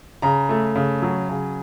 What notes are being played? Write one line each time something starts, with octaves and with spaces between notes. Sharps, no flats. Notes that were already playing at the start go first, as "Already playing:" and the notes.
C#3 A#5
A3
C#3
F#3
C#3